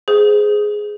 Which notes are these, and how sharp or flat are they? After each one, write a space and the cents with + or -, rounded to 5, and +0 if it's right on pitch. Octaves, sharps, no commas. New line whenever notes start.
G#4 +5 C5 -15